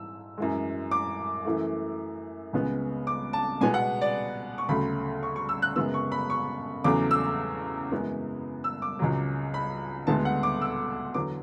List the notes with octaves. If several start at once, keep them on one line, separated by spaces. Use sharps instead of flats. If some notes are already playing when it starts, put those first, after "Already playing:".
Already playing: G#2 E3 E6
F#2 E3 G#3
D6
F#2 E3 A3
C#2 C#3 G#3 B3
D6
A5
B2 G#3 B3 G#5
F#5
D5
C#6
D2 C#3 F#3 A3 B5
C#6
C#6
E6
F#6
F#2 C#3 G#3 B3 E6
C#6
B5
C#6
E2 C#3 F#3 A3 D6
E6
F#2 E3 G#3 B3
E6
D6
C#2 C#3 F#3
B5
D2 D3 G#3 B3 A5
F#5
D6
E6
E2 D3 F#3 B3 D6